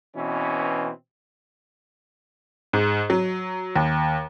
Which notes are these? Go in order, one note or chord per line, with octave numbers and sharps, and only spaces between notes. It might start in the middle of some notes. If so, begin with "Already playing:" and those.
B2 E3 C4 C#4
G#2
F#3
D#2